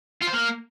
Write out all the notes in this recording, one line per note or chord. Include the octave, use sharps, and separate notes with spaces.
F4
C5
A#3